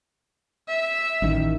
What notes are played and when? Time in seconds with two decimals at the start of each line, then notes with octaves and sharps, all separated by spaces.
0.68 E5
1.22 A1 D#3